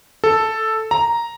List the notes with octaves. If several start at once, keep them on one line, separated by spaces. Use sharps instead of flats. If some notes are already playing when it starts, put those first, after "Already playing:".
A4
A#5